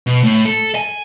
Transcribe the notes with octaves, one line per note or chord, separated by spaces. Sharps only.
B2
A2
A4
G#5